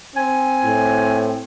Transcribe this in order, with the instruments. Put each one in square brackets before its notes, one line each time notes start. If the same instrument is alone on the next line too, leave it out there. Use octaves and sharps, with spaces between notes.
[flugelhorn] C4 [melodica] G#5
[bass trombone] A2